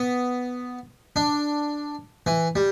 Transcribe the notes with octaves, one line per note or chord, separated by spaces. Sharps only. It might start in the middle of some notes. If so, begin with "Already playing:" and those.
Already playing: B3
D4
E3
G3